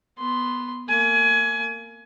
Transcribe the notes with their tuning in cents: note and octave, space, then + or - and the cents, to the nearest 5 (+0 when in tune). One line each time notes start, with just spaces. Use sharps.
B3 +0 C6 +0
A#3 -25 G#5 +25